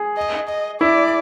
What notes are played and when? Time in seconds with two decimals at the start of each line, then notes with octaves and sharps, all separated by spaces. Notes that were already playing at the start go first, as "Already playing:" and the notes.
Already playing: G#4
0.17 D#5
0.48 D#5
0.81 E4 D5